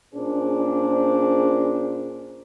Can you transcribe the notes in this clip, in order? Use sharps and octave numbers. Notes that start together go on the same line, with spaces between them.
A#2 C#4 D4 G#4 C5